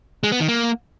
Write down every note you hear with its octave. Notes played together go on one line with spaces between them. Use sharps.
G#3
B3
D#3
A#3